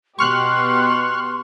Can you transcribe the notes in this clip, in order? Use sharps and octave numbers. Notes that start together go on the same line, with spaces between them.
B2 B3 G4 C6 C#6 F6 F#6